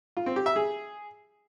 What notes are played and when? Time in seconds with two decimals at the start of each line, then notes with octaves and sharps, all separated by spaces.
0.17 F4
0.26 C4
0.36 G4
0.46 E5
0.56 G#4